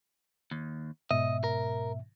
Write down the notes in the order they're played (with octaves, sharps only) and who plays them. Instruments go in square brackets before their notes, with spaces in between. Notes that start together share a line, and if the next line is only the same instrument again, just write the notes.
[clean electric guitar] D#2
[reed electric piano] G#2 B2 E5 [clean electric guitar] D#5
[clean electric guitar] A#4